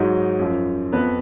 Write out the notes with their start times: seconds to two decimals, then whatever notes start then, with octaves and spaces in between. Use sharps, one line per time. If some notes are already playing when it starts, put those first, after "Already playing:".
Already playing: G#2 F#3 D#4 D#5
0.39 F#2 F3
0.92 F2 F3 B3 B4